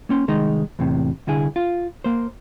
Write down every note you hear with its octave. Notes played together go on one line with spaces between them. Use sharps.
A#3 C#4 C6
C2 D#3 G#3 D#4
E2 A2 C3
C2 D3 E4 G#4
F4
A#3 C5